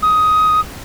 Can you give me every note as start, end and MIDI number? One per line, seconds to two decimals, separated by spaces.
0.02 0.60 87